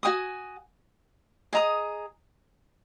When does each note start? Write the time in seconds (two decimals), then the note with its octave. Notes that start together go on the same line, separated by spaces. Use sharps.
0.03 F#4 C#5 G#5 D#6
1.53 G#4 D#5 A#5 D#6